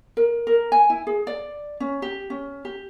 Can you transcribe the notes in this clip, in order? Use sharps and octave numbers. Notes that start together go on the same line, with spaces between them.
A#4
A#4
G#5
E4
G#4
D5
C#4
G4
C#4
G4